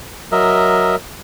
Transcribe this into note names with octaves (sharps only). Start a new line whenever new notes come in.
F#3 A#4 D#5 E5